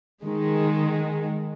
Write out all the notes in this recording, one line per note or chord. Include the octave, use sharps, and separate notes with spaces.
D#3 G#3